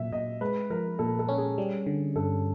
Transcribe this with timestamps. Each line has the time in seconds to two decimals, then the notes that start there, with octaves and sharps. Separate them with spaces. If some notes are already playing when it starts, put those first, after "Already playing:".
Already playing: A#2 F#3 E5
0.12 A#2 D#5
0.41 G#3 B4
0.70 F3 A#4
0.99 A#2 A4
1.19 A4
1.28 C#4
1.38 G#4
1.58 G3
1.86 D3
2.16 G2 A4